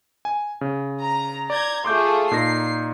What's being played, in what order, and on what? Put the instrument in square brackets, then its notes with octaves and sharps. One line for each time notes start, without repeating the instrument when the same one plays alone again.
[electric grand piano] G#5
C#3
[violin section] A#5
[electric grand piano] D5 [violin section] A#5 G6 G#6
[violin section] A3 F4 G#4 [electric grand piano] C6 D6 G6
[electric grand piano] A#2 D#4 A#6 [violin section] C7